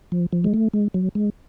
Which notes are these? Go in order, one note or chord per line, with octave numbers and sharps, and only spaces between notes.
F3
F3
G#3
A3
G#3
F#3
G#3